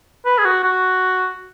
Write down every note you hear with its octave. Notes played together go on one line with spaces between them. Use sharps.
B4
G#4
F#4
F#4